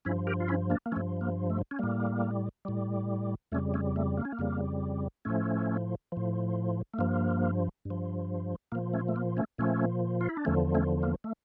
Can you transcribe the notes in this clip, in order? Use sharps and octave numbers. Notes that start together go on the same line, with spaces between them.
G2 F3 C#4 E4
G4 A#4
F4
C#4 E4
A#3 D4
A#3
G2 F3 A3 C#4
A#3
A3
C#4
A2 G3 A#3
A2 G3
F2 C#3 G3 A3 C#4
A3 C#4
A3
A#3
C#4
A#3
F2 C#3 G3
A2 F3 A3 C#4
A2 F3
A3
G2 F3 A#3
G2
F3
A#2 F3 A#3
A3 C#4
A3
A#3
A3 C#4
A#2 F3 A3 C#4
F4
E4
D4
E2 D3 F3 A3 C#4
A3 C#4
A#3
A3